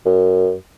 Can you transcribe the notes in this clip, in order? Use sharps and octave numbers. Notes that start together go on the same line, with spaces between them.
F#2